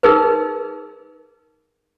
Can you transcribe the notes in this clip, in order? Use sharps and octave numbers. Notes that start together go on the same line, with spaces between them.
D#4 G#4 A#4 B4